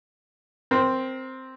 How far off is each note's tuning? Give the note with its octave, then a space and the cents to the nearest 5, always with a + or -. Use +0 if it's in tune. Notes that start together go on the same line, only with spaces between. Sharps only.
C4 +0 A#4 +25